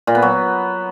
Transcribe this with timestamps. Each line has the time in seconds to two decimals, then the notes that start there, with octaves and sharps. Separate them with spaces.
0.07 A#2
0.15 B3
0.22 F#3